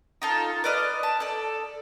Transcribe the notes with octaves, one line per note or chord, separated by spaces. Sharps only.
D#4 F4 A4
B4 D5 D#5 F6
A5
A4 D5